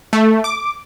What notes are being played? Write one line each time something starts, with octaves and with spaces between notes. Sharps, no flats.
A3
D6